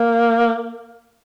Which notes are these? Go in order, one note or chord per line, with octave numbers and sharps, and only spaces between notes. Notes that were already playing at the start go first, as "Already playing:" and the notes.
Already playing: A#3